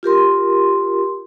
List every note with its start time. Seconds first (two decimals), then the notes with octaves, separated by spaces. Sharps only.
0.03 F4 G4 A#4 C6